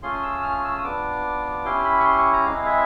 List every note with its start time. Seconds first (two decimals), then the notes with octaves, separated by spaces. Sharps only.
0.03 A3 C#4 F4 G#4 C6
0.23 E6
0.43 F6
0.64 E6
0.78 D#6
0.83 B3 D4 F4 D6
1.65 C#4 E4 G4 C6
1.85 B5
2.00 C#6
2.05 C6
2.18 C#6
2.33 A#5
2.46 G#3 C4 E4 G#4 F5
2.66 E5